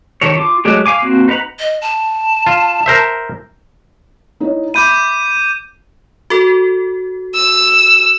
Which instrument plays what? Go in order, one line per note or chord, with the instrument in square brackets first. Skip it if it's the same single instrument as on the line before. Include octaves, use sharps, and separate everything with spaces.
[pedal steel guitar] D#3 G4 A4 C#5
F4 D6
F#3 G#3 A3 G4
F5 G#5 D6
A#3 C4 F#4
D#4 B4 F#5 A#5 B5
[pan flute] D#5
A5
[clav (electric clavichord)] F4
A#4 C5 E5
[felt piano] D#4 E4 C#5
[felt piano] E5 B5 [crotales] D6 G6 D#7
[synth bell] F#4 A4
[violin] E6